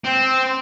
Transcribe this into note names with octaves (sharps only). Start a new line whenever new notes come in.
C4